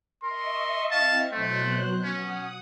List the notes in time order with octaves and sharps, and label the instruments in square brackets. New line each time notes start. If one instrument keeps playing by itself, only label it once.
[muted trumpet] A#4 [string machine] D#5 E5 C#6 [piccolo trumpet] C6
[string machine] C4 E4 [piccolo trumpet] F5 [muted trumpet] A5
[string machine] B2 F#3 F#6 [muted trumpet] A3 [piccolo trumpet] C5
[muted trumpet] C#4 [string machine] F#5 D#6